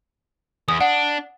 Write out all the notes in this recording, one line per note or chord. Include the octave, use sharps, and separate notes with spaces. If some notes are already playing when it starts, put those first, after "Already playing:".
E2 D#6
D4 F#5